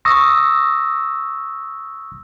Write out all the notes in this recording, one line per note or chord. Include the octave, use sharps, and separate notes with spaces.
C#6 D#6 E6 A#6